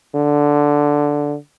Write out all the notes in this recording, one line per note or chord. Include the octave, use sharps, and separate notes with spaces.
D3